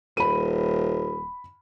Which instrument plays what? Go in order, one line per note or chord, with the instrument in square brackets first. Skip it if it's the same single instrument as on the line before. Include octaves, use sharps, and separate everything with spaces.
[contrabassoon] D#1 [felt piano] B5 D#7